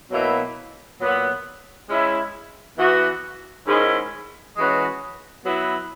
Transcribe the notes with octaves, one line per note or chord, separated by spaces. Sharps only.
B2 F#3 A#3 E4
A#2 F#3 B3 F#4
G#3 C#4 E4
E3 B3 F#4
G#2 D#3 G#3 C#4 E4
E3 G#3 C#4 F#4 B4
F#3 B3 E4 B4